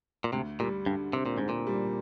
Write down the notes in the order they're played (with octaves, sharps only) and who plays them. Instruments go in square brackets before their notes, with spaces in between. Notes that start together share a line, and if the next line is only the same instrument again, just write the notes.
[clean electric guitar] A#2
[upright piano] D2 [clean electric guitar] C3
[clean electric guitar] A#2 [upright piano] G3
[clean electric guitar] G2 [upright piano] D3
[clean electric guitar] C3 [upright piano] C4
[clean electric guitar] A#2
[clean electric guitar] G#2 [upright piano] D3
[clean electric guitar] A#2
[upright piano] G3